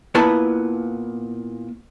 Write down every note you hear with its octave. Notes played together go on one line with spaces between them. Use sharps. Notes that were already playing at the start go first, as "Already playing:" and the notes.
A#2 B3 E4 B4 A5 B5